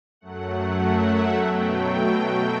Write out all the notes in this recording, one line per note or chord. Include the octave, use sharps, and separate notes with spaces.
F#2 F#3 A3 F#5
F#5
E5
B2 F#3 A3 G5